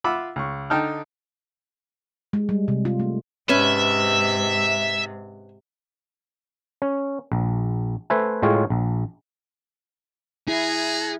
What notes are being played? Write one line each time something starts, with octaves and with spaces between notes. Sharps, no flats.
F4 E5 F#5 B5 D6 E6
C#2 C#6
D3 D#4 G5 A5 F6
G#3
G3
C3
F4
A3
G#2 C3 C#4 B4 E5
C#4
A#1
A3 B4 C5 E5 G#5
A2 G#3 F4 C#5 G5
A#1
C#4 E4 F#4 G#4 A#5